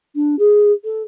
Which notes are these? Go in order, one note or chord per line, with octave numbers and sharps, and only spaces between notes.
D4
G#4
A4